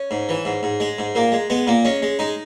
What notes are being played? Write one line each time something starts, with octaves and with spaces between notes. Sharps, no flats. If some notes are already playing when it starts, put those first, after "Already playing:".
Already playing: C#4
G#2
E3
G#2
G#2
G#3
G#2
A#2 A#3
G#3
G#3 B3
A#2 A#3
G#3 C#4
G#3
G#3 D#4